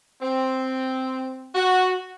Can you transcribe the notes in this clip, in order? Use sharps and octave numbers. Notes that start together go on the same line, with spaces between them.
C4
F#4